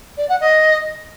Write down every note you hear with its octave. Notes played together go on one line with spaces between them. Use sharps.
D5
F#5
D#5